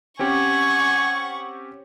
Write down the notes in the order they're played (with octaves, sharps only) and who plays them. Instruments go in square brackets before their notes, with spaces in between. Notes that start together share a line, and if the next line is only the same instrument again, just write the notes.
[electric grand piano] C4 C#4 G4 [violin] F#5 C#6 [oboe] G#5